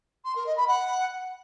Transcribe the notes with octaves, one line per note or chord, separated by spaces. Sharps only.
C6
A#4
D#5
B5
F#5